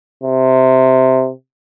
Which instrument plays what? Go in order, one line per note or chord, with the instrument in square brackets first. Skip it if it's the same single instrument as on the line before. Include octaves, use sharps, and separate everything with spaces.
[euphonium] C3